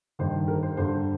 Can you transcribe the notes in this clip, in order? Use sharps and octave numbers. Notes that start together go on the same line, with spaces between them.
G2 D#3 C5
A#4
C5
G2 D3 C5